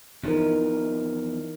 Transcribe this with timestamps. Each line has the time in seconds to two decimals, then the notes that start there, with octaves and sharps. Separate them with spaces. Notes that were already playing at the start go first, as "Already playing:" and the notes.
0.24 E2 E3 F3 D#4 A#4